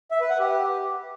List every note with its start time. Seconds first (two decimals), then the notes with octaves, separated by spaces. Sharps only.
0.11 E5
0.21 B4
0.30 F#5
0.39 G4